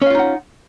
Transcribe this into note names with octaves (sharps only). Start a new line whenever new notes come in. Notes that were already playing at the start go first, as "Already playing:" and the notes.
C#4 D#4 F4 F5 F#5